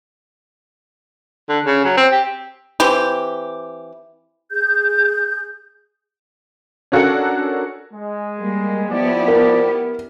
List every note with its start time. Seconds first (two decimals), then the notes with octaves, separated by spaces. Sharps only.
1.49 D3
1.66 C#3
1.85 F#3
1.97 C4
2.12 G4
2.80 E3 C4 G4
4.50 G#4 G6
6.92 C#4 D4 F#4 A4 A#4 F#5
7.92 G#3
8.38 G3 A#3
8.89 F3 B3 E4 G4 D5
9.28 A#4